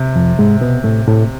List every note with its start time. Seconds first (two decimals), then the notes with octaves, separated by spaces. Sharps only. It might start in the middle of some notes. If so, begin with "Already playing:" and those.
Already playing: C3
0.16 F2 F3
0.39 G#2 G#3
0.61 B2 B3
0.84 A2 A3
1.07 A2 A3